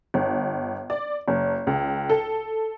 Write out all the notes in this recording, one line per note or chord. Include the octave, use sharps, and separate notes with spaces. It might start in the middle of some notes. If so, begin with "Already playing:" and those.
G1
D5
F#1
C#2
A4